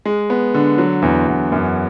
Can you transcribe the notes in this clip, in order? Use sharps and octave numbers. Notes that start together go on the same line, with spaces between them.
G#3
B3
D3
F#3
E2
E2
F#2